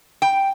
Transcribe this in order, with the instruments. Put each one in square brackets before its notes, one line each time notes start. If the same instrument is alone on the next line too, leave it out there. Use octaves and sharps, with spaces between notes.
[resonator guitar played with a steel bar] G5